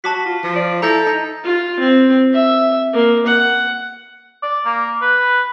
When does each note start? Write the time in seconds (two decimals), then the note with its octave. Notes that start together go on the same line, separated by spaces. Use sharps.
0.04 F#4 A5 D6 B6
0.26 F4
0.44 F3
0.56 D5
0.82 E4 A4 A#5 G6 A#6
1.07 D#4 A#5
1.44 F4
1.79 C4
2.33 E5
2.93 A#3
3.27 F#5
4.43 D5
4.66 A#3
5.02 B4